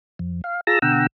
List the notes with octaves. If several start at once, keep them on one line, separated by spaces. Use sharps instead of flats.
F2
F5
F4 G#4 A5 A#5 E6 A#6
B2 D3 F#5 G5 A#5 E6